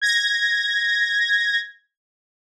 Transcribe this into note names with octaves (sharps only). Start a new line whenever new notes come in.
G#6 A#6